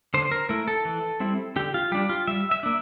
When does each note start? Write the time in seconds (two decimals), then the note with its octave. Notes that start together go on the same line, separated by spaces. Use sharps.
0.14 D3 C5
0.31 A#4
0.49 A3 E4 A#4
0.68 A4
0.85 E3
1.20 G3 C4 E4
1.56 D3 G4
1.74 F4
1.92 G3 D4 G4
2.09 F4
2.27 G3 E5
2.51 E5
2.63 A#3 D4